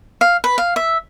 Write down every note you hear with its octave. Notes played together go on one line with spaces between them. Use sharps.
F5
B4
F5
E5